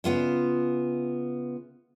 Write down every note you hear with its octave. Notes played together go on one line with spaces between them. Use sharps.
C#3 B3 F4 E5